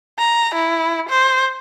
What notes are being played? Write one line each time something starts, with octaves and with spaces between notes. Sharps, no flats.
A#5
E4
C5